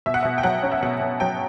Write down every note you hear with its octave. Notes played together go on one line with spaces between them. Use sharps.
B2 E5
F#5
B2 E5
G5
F#3 F#5
C#4
E5
B2 F#5
B2
F#3 G5